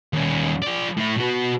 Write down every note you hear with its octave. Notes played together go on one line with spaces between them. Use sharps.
D#2 C#4
F3 D5
A2 E4
B2 F#4